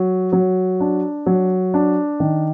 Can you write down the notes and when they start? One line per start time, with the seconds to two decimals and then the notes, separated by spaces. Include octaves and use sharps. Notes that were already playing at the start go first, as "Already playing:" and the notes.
Already playing: F#3
0.33 F#3
0.80 D4
1.26 F#3
1.74 D4
2.20 D#3